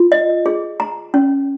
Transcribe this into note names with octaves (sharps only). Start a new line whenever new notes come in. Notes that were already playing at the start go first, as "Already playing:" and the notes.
Already playing: F4
D#5
G#4
A#5
C#4